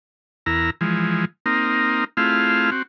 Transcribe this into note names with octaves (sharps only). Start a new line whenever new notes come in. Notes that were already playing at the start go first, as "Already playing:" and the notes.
E2 E4 A#4 A#5
E3 F3 G#3
A#3 C4 D#4 A#4
A3 C4 E4 F4 G#4 F5
C4 F#4